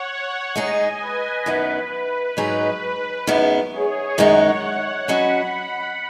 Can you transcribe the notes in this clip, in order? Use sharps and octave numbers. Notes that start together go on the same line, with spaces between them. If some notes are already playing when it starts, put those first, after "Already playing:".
Already playing: C#5 F#5
G#3 D#4 G#4 D#5 G#5
B4
F#2 D#3 B3 B4
G#2 F#3 D#4 G#4 B4
F#2 D#3 G#3 B3
G#4 C#5
F#2 D#3 G#3 D#4 C#5 F#5
C#5 F#5
F#3 C#4 F#4 D#5 F#5 B5